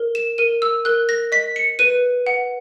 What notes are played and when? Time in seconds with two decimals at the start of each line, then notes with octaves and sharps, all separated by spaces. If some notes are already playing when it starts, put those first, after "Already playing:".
Already playing: A#4
0.15 E7
0.38 A#4 D#7
0.62 E6
0.85 A#4 F#6
1.09 A#6
1.32 D#5 B6
1.56 C#7
1.79 B4 D#7
2.27 F#5